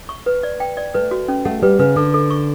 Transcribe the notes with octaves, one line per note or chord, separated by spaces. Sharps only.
C#6
B4
D5
G5
D5
A3 B4
F#4
C#4
A3 F#5
G3 B4
C#3 B4
D3 A4
A4
C#6